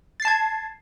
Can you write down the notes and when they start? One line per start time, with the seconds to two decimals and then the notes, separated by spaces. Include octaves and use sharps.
0.20 A6
0.22 C7
0.25 A5
0.28 G#6